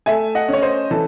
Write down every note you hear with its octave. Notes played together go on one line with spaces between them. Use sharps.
A3 E5 G#5
D#5 F#5
C#4 C#5
C5 D#5
E3 A4